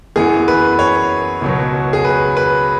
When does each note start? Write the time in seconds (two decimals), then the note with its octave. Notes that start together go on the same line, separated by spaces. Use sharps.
0.16 F#2 E3 B3 G#4
0.48 B4
0.79 C#5
1.41 C#2 B2 F#3
1.93 G#4
2.05 B4
2.37 B4